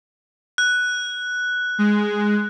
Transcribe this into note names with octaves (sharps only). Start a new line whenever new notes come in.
F#6
G#3